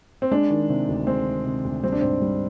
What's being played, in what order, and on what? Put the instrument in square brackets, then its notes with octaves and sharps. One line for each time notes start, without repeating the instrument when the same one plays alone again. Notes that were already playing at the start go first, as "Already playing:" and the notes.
[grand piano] C4
G#3 D4
D#3
C3
D2
G#3 C4
D#3
C3
D2
G3 C4
D4
G#2 C4
G3